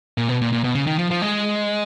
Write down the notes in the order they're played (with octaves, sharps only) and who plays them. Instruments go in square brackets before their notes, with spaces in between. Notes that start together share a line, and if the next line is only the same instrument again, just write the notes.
[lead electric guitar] A#2
B2
A#2
A#2
B2
C#3
D#3
F3
F3
G#3